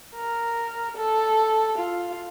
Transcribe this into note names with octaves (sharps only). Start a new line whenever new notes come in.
A#4
A4
F4